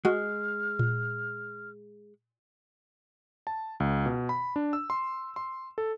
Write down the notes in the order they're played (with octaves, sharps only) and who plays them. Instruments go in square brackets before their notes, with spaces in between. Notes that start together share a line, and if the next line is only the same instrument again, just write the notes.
[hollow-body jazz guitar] G#3 [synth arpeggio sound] F#4 [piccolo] F6
[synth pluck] A#2
[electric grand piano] A5
C#2
B2
B5
D4
E6
C6
C6
A4